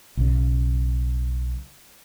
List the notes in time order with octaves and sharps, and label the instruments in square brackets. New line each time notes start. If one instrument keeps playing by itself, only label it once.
[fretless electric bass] B1 C#3